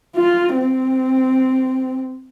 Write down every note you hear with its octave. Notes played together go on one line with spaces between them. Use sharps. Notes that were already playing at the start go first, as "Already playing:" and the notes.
F4
C4